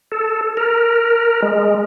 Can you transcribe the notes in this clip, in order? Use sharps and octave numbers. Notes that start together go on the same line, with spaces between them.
A4
A#4
G#3